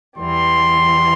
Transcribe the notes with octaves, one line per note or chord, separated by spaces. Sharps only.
E2 E3 G3 C6